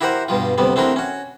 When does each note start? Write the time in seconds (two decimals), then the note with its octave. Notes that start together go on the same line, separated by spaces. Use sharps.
0.01 E4 F#4 G4 A#4 C5 F#5
0.28 G2 B2 G3 F4
0.58 D2 C3 G3 B3
0.76 A3 C4 D4 E4 F#4 A#4
0.96 C#4 F#4